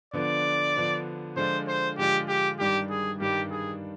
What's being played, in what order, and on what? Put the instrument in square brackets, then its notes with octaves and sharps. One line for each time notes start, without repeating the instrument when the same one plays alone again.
[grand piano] D3 F3 B3 D4 [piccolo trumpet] D5
[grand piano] D3 F3 B3 D4
[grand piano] D3 F3 G#3 D4 F4 [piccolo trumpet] C5
[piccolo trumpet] C5
[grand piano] D3 F3 G#3 D4 F4 [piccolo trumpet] G4
[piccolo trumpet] G4
[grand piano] G2 D#3 G3 D4 [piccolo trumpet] G4
[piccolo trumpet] G#4
[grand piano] G2 D#3 G3 D4 [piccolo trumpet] G4
[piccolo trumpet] G#4